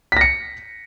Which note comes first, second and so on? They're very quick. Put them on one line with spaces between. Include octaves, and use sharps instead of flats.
B6 A#6 C#7